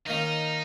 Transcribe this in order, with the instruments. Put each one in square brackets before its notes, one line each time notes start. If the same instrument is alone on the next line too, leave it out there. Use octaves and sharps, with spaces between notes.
[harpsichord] D#3 A#3 C#4 [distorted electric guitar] D#4